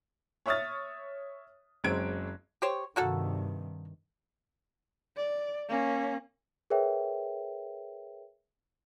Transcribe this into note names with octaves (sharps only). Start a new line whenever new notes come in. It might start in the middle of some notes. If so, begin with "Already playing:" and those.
C#5 E5 C#6 D#6 F6 A6
F#1 F#3 G#3 C4 G#6 D7
G4 C5 C#5
G2 C3 D#3 A#3 F#4 A4
D5
A#3 C#4
G#4 A#4 B4 C#5 E5 G5